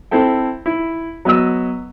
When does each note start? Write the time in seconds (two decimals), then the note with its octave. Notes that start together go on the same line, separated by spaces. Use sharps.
0.11 C4 E4 A4 G5
0.66 E4
1.25 F#3 B3 D#5 E6